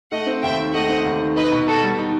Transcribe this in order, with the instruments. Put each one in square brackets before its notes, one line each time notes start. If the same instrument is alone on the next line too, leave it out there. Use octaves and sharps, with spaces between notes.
[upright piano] A3 [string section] D#5 F#5
[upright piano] C4
[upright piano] D#2 [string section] E5 G5
[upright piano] D#3
[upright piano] A3 [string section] D#5 F#5
[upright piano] C4
D#2
D#3
[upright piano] D#4 [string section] B4 D#5
[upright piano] B2
[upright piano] B2 [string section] F#4 A4
[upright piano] G3
D#4